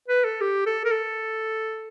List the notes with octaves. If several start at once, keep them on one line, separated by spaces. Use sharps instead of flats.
B4
A4
G4
A4
A#4
A4